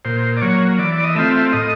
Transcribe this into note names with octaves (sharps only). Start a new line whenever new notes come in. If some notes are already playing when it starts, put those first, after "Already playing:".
A#2 C5
D5
F#3 A#3 C#5
E3 D5
D#5
A3 C4 F4 E5
A2 D#5